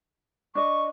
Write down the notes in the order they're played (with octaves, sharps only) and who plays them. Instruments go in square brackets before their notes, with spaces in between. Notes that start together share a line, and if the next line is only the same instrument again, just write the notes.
[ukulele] D4 D#5 [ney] C#6